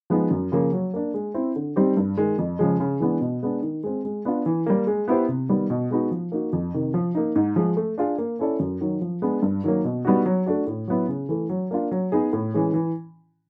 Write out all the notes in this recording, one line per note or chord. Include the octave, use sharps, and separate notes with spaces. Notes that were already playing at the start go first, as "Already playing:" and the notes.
F3 G#3 B3 D#4
F#2
C#3 F3 A#3
F#3
A#3 D4
G#3
C4 E4
D3
G3 C4 D#4 G4
G2
D#3 G#3
F2
C#3 F3 G#3
C#3
E3 G#3 B3 D4
B2
G#3 B3 D4
D#3
G#3 C4
G#3
B3 D4 F4
E3
G3 A#3
G#3
B3 E4 G4 C5
C3
D#3 G3 B3
B2
G#3 B3 D#4 F#4
F3
A#3 D#4 F#4
F2
C3 D#3
F3
A#3 D#4
G#2
F3 G#3
A3
D4 F4 G#4
A#3
C#4 E4 A4 D5
F#2
D#3 F#3
F3
G#3 B3 D4
G2
D#3 F#3 A#3
B2
G3 B3 D#4 F#4
F#3
A3 D4 F#4
A2
F#3 B3 E4
C#3
E3 A3
F#3
A#3 D4 F4
F#3
B3 D#4 G#4
A2
E3 G#3 C#4
E3